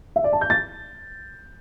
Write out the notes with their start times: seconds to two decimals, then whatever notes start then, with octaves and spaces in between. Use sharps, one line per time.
0.16 E5
0.24 D5
0.33 A5
0.41 G6
0.50 A6